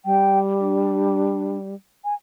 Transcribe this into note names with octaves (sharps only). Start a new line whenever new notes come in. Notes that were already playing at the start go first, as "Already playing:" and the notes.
G3 G5
D4
G#5